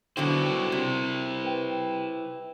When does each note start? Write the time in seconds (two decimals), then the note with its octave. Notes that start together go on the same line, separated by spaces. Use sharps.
0.17 B2 D3 F#3 E4 C5 G5
0.72 C3
1.43 B4 G5